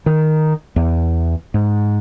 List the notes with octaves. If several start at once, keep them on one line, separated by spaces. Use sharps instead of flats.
D#3
E2
G#2